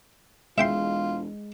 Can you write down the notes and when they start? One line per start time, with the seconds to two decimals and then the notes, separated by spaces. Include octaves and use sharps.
0.58 E1 G#3 F4 E5 G5 C6